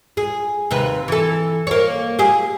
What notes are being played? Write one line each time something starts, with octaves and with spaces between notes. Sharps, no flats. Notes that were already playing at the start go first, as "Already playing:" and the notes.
G#4
D#2 C3 B4
E3 A4
A#3 C#5
G4 G#4